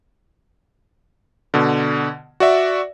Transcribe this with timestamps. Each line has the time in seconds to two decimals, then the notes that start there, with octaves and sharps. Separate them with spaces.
1.54 B2 D3
2.40 F#4 D5 E5